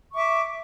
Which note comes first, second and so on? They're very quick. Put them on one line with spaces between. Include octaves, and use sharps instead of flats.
C#6 D6 E5